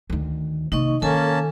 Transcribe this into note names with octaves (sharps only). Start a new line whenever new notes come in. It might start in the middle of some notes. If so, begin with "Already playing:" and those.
D2 D#3
C3 A#3 D#4 D#5 C#6
D#3 A#3 C#4 A4 G#5 A5